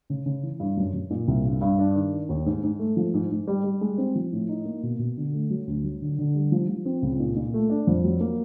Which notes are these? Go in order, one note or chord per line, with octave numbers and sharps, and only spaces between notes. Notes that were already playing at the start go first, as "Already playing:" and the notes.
C#3
C#3
E3
G2
F#2
F#2
A#2
C2
G2
G2
D4
D#3
D#3
D#2
G#2
G#2
A3
F3
G#2
G#2
G3
G3
G#3
C4
F3
A2
D#4
A#3
B2
B2
D3
A3
F#3
D2
F#3
D3
D3
G3
F3
F3
C4
C#2
A#2
A#2
A3
D4
F2
F#3
A#3